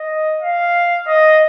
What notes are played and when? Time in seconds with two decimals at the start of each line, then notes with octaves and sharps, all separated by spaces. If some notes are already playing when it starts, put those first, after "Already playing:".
Already playing: D#5
0.42 F5
1.08 D#5